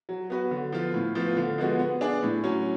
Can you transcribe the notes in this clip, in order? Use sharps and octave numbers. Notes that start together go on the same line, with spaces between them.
F#3
B3 F#4 B4
D3
F3 B3 F4
A2
F3 B3 F4
D3
F3 G#3 B3 F#4
B3
D4 G#4 D5
A2
F#3 C#4